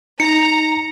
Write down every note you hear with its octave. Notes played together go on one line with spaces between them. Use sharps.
D#4 A#5 C#7